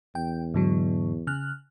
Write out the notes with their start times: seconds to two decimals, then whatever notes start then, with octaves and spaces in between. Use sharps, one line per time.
0.15 E2 G5
0.54 G#2 D3 F#3
1.27 C#3 F6 F#6